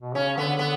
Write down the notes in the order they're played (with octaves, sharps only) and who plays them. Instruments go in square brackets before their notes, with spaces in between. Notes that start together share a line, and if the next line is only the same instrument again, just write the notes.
[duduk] B2
[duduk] C#3 [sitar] C#4
[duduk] D3 [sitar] B3
[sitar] B3